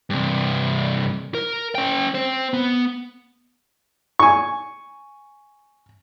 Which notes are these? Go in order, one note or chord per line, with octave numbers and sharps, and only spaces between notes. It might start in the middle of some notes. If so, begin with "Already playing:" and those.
G2 C3
A#4
C#4 G5
C4 C5
B3
G#5 C#6